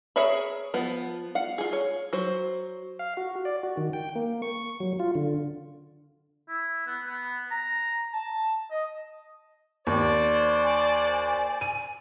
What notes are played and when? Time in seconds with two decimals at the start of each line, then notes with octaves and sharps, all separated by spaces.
0.16 G#4 A#4 C#5 E5 B5
0.74 F3 B3
1.35 F5 F#5
1.58 F4 G#4
1.73 C#5
2.13 F#3 C5
2.99 F5
3.17 F#4
3.45 D5
3.63 F#4
3.77 D#3
3.93 G5
4.16 A#3
4.42 C#6
4.80 F#3
5.00 F4
5.15 D3
6.49 E4
6.87 B3
7.07 B3
7.51 A#5
8.13 A5
8.71 D#5
9.87 D#2 C5 D5
10.63 G#5
11.61 D#7